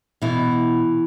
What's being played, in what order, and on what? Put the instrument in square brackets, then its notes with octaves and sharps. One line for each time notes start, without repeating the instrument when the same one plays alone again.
[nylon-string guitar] B2 E3 E4